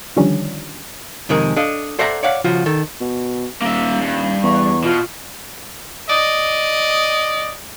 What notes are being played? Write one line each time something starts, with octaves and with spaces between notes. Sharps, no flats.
D3 D#3 F3 G3 C#4 D4
F2 C3 D#3 G#3 G#4 A#4
D4 A4 D#5 F5
A4 C5 D5 E5 F#5 A#5
C#5 D5 F5 F#5
C#3 F3 F4 F#4
D#3 A4
B2
D#1 A#3 E5
G2
E2 C#6
B2 F4
D5 D#5